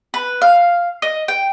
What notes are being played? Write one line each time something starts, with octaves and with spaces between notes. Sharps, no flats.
B4
F5
D#5
G5